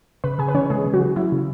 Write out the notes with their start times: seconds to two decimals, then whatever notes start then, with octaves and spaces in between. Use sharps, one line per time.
0.24 C#3 B4 B5
0.39 C#3 G#4 G#5
0.48 B4
0.55 E3 C#4 C#5
0.70 C#3 G#3 G#4
0.86 C#3
0.93 F#3 F#4
1.01 E3
1.16 F#3 E4
1.32 C#3